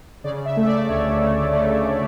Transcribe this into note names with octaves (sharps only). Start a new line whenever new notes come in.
C#3 D5
E5
A3
E5
D5
D2 C#5
A3
A3